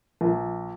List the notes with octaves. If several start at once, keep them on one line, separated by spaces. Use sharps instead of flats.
A#1